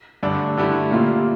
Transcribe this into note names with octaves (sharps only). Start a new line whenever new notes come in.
G2 D3 A3 D4
D3 A3 E4 G4
A#2 G3 A#3 F4